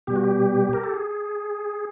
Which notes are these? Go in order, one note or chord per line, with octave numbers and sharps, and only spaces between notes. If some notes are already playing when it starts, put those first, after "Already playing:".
B2 G3 G4
F#4
G4
A#4
A4
G#4